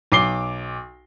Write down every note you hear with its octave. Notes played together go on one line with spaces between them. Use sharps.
B1 D6 C7 G7